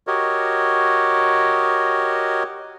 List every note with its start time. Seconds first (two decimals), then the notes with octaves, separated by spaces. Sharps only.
0.07 F#4 G4 A#4 C#5 D#5